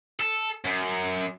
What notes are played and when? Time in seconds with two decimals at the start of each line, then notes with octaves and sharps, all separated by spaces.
0.20 A4
0.65 F#2